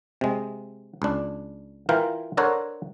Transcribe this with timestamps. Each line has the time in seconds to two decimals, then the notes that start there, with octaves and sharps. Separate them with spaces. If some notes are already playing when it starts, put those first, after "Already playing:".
0.21 C3 G#3
1.02 C#2 D4
1.89 E3 F4 A#4 F5 G5
2.37 D4 A4 A#4 C5 C#5 F#5